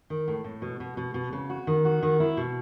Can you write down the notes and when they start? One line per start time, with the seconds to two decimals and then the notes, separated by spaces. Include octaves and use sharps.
0.10 D#3
0.28 A2
0.44 A2
0.62 B2
0.80 B2
0.97 B2
1.14 B2
1.33 C#3
1.50 F#4
1.67 D#3
1.85 F#4
2.03 D#3
2.20 E4
2.37 B2